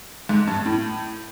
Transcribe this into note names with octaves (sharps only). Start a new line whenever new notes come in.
G#2
G2
A2